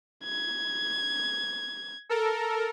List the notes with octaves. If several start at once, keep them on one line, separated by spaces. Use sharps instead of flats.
G#6
A4 A#4